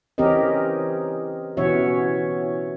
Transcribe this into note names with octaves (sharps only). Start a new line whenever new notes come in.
E3 C4 C#4 G4 A#4 D#5
B2 E3 C#4 F#4 C#5 E5